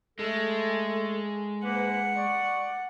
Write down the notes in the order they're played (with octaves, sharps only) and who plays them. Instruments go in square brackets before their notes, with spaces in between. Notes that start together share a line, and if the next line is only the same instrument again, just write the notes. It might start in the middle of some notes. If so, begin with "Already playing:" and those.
[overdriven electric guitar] G#3 [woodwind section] A3 A4
[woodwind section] G#2 A#3 B4 [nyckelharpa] F#5
[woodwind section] D5 C#6